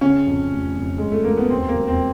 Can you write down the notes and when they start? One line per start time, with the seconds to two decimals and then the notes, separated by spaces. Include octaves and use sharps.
0.01 C#3 C#4
0.27 F2
0.51 F1
0.76 F2
0.98 F2 G#3
1.12 A3
1.24 F1 A#3
1.37 B3
1.50 D#2 C4
1.68 A#3
1.74 E1
1.88 C4